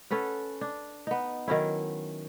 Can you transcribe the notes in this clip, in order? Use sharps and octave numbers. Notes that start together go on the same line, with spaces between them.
C#4 A4 B4 F#5
D4
B3 D#4
D#3 F#3 C#4 E4